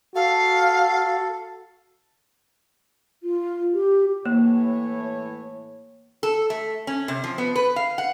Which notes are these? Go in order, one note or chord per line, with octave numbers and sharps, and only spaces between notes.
F#4 A4 F5
F4
G4
A2 E3 A#3 C#5
A4
A3
C#4
C3
F3
B3
B4
F5
F#5